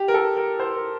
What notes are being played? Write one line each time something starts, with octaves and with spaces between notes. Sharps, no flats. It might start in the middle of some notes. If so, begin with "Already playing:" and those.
Already playing: G4
A#4
A4
A#4
C5
A#4